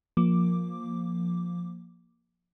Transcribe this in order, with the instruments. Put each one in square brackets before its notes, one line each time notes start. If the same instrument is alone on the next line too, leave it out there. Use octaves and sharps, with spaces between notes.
[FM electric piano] F3 A#3 D6